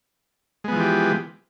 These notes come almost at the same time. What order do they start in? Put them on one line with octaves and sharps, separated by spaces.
G#3 B3 F3 E3 G4